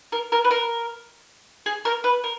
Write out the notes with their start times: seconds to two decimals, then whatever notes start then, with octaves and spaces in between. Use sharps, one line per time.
0.12 A#4
0.32 A#4
0.44 B4
0.51 A#4
1.66 G#4
1.85 A#4
2.04 B4
2.24 A#4